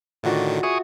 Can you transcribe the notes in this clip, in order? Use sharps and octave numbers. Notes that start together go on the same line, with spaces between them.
A2 D3 D#3 F4 F#4 D5
G#4 E5 C#6 D#6